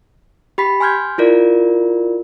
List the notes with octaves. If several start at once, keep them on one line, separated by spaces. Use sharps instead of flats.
G4 B5 B6
G#5 C6 F6 G6 G#6
E4 F4 A#4 D5